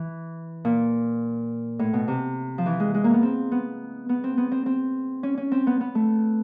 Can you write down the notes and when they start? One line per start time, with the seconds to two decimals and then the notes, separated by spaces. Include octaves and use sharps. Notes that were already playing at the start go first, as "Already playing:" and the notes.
Already playing: E3
0.65 A#2
1.79 A2
1.93 B2
2.08 C3
2.58 F3
2.66 E3
2.80 G#3
2.95 G#3
3.04 A#3
3.13 B3
3.23 C4
3.52 B3
4.09 B3
4.24 C4
4.38 B3
4.52 C4
4.66 C4
5.23 C#4
5.37 C#4
5.52 C4
5.67 B3
5.81 B3
5.95 A3